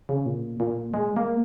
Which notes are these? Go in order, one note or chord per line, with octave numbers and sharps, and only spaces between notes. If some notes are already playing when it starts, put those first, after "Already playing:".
C#3
A#2
A#2
G#3
A#3